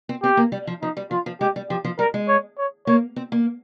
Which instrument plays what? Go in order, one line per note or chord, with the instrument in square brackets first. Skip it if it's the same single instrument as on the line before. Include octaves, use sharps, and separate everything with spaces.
[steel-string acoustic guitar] C4
[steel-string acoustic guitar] C4 [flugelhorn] G4
[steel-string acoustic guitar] A#3
G3
F3
[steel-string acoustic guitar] F3 [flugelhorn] D#4
[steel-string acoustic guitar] G3
[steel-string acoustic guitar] F3 [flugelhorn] F4
[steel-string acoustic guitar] F3
[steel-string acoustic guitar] G#3 [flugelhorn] G4
[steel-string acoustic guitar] G3
[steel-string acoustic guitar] F3 [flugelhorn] G4
[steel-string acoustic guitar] F3
[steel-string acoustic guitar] G3 [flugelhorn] A#4
[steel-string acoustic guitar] G#3
[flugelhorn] C#5
C#5
[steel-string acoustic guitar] A#3 [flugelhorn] C#5
[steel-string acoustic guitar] C4
A#3